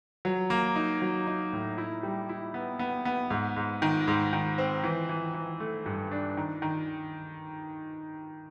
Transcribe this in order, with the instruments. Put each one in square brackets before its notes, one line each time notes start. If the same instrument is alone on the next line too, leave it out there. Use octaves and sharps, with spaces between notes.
[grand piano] F#3
A#3
D#4
F#3
D#4
A2
E4
G3
E4
B3
B3
B3
G#2
G#2
D#3
G#2
D#3
C4
E3
E3
E3
A3
G2
D4
D#3
D#3